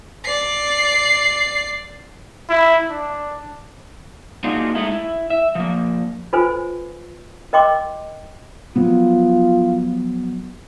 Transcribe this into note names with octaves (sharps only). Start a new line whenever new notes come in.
D5 C7
E4
D4
A#3 D4 D#4 F4 F#4 G#4
G#3 A3 D#4 E4
E4
E5
F3 A#3
F4 A4 B4 C5 G#5
A#4 D#5 G5 C6 D6
F3 F#3 B3 F4